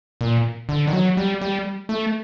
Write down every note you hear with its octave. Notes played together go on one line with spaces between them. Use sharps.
A#2
D3
D#3
F#3
G3
G3
A3